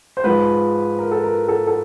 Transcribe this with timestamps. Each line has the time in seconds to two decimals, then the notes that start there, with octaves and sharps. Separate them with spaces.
0.17 C5
0.24 G#2 F3 B4
0.99 A#4
1.11 A4
1.24 A#4
1.48 A4
1.67 A4